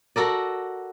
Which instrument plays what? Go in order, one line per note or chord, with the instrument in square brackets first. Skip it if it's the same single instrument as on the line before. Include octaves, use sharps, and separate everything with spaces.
[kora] F#4 A4 A#4 D5